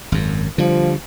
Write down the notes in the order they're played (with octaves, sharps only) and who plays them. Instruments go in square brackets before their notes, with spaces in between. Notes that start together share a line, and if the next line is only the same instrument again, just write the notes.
[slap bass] G#1 F#2
[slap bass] D3 G3 [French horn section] F3